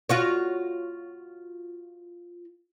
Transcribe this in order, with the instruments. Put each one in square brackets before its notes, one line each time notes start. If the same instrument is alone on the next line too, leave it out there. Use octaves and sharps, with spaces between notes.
[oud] F4 F#4 C#5